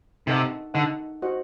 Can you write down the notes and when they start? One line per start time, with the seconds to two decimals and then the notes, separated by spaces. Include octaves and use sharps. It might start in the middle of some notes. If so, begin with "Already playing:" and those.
0.27 C3 D#4 A4 D#5 F#5
0.74 D3 D#4 A4 D#5 F#5
1.22 F#4 C5 D#5 F#5